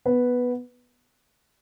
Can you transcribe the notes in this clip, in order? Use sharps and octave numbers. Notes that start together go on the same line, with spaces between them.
B3 B4